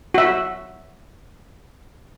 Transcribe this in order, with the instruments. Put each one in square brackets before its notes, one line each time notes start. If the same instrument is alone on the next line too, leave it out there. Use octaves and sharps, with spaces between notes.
[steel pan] F#4 E5